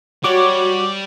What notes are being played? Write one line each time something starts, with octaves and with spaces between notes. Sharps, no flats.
G3 F#4 C#5 D6